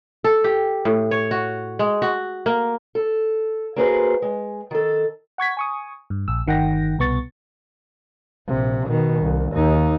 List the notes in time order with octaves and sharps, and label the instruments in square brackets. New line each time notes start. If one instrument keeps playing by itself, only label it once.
[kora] A4
G4
A2
C#5
F#4
G#3
F#4
A#3
[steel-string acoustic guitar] A4
A#3 F#4 G#4 B4 C5
G#3
D#3 A4
[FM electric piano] F#5 C#6 G#6 B6
G#5 C#6 D#6
G2
A#1 E6
G1 D#3 F#5 G5 A#6
C2 B2 B3 C#6 A6
[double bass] A#1 C3
B2 D#3
C2
D#2 D#4